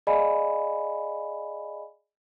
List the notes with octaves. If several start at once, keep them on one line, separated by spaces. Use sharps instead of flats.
G#4 D5 D#5 F5 G#5 B5